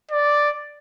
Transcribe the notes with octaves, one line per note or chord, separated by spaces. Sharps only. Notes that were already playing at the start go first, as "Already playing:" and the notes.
D5